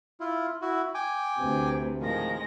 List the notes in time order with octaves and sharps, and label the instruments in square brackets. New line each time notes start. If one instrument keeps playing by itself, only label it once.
[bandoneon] E4 F4
E4 F#4
G5 G#5 D6
[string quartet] D2 C3 B4
[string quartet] A2 G#3 A#6 [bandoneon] D#3 F3